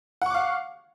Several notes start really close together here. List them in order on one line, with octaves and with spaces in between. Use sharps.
F#5 C#6 D6 F5